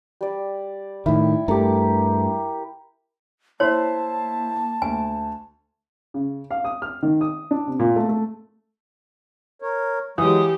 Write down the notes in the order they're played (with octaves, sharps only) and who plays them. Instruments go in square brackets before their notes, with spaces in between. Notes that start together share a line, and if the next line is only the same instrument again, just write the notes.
[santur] G3 D5
[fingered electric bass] A2 D#3 [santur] E4
[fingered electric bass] G2 A3 [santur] G4 A#4
[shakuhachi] A#3 [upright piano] E4 C5 C6 [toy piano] C#5 [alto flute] A5
[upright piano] D2 [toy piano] G#5
[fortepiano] C#3
F5
D#6
F6
D#3
D#6
D4
C3
A#2
A3
A3
[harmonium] A#4 C#5
[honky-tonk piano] E3 [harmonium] F#3 G#3 [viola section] G4 [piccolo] D#6